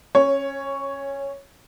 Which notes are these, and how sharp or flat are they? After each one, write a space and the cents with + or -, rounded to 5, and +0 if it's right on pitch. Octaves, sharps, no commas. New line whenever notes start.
C#4 -20 C#5 +0